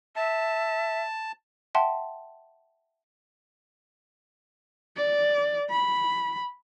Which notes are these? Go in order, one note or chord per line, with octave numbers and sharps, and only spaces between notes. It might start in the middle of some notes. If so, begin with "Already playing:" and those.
E5 A5
E5 F#5 G5 A5 C6
D5
B5